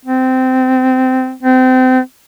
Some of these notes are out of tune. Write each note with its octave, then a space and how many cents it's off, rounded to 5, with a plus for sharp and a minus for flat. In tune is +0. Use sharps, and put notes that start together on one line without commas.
C4 -20
C4 -30